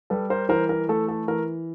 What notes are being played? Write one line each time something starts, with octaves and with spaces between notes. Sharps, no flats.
G3 A4 B4
A#4 C5
E3 A#4 C5
A#4
A3 A4
A4
E3 A#4